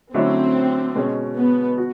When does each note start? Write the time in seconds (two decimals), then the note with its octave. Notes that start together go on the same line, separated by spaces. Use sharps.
0.14 D3 F#3 A3 C4 C#4 E4
0.95 B2 G#3 C#4
1.37 B3
1.77 F#4